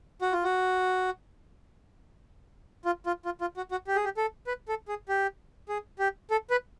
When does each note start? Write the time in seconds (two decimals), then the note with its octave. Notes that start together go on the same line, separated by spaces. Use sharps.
0.22 F#4
0.33 F4
0.44 F#4
2.85 F4
3.06 F4
3.25 F4
3.41 F4
3.57 F#4
3.71 F#4
3.87 G4
3.96 G#4
4.04 G4
4.17 A4
4.47 B4
4.68 A4
4.88 G#4
5.09 G4
5.69 G#4
5.99 G4
6.31 A4
6.50 B4